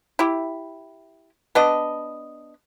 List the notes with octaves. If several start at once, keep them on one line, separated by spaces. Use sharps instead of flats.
E4 G4
B3 D4 D#5